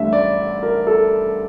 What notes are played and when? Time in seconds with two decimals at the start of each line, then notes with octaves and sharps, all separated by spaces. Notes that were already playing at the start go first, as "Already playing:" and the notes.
Already playing: A1 G2 D3 A3 E5
0.13 D5
0.63 A#4
0.87 A4